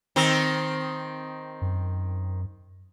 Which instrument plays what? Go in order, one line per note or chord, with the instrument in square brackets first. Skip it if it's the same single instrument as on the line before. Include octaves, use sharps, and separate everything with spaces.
[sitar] D#3 C4
[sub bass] F#2